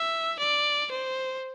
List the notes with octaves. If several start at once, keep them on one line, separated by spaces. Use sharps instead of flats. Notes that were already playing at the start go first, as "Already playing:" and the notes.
Already playing: E5
D5
C5